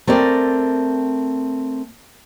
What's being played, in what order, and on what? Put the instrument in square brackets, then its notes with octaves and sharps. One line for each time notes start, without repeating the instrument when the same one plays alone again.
[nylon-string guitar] A3 C4 A#4 D5